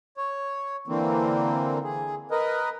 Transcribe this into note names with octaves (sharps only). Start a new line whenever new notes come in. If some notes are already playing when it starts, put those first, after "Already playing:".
C#5
D3 E3 A#3 C4
G#4
A#4 B4 D#5